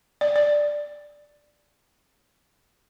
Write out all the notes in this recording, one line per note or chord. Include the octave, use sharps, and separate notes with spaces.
D5
D5